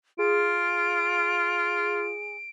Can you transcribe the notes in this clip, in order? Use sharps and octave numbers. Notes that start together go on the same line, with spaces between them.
F4 G#4 D7